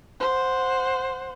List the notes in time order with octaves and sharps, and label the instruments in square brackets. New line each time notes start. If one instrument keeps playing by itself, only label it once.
[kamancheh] C5 F#5